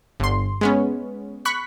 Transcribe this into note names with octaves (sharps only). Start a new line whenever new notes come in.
G1 C6
G#3 B3 C#4
B5 C#6 F#6 B6